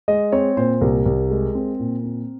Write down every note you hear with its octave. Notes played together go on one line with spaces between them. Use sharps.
G#3 D#5
C4 C#5
A#2 C5
C2 A#4
C2
G#3
C4
A#2
C4